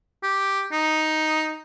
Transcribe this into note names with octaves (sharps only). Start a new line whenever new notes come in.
G4
D#4